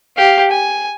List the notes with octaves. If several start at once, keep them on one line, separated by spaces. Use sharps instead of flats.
G4 F5
G#5